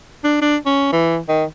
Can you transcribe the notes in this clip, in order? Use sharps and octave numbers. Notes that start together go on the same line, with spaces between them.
D4
D4
C#4
E3
D#3